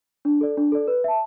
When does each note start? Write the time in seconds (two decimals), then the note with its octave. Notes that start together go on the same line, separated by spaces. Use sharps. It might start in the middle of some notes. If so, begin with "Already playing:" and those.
0.25 D4
0.41 A4 D5
0.57 D4
0.72 A4 D5
0.88 B4
1.04 E5 A5